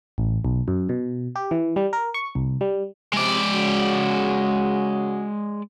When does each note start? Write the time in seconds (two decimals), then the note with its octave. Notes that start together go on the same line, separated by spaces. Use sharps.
0.18 A1
0.45 B1
0.68 F#2
0.89 B2
1.36 G4
1.51 E3
1.76 G3
1.93 A#4
2.14 C#6
2.35 C2
2.61 G3
3.13 C3 G#3 D5
3.53 C#3 F#4